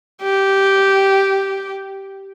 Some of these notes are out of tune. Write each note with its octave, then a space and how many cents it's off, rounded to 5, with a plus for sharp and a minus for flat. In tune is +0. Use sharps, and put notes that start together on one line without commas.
G4 -10